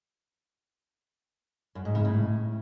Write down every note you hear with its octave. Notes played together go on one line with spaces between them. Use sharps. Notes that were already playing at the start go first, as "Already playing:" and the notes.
F#2
G#2
C#3
A2